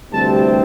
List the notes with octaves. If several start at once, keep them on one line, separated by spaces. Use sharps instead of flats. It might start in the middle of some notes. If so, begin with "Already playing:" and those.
D2 C3 E3 G3 C4 A5